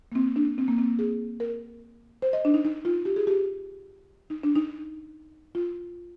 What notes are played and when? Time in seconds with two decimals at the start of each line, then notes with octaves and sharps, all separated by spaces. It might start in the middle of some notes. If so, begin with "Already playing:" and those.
0.12 A#3
0.15 C4
0.36 D4
0.58 C4
0.68 A#3
0.78 C4
0.99 G#4
1.40 A#4
2.22 C5
2.33 D#5
2.45 D4
2.54 D#4
2.65 D#4
2.85 F4
3.05 G4
3.16 G#4
3.27 G4
4.30 D#4
4.43 D4
4.56 D#4
5.55 F4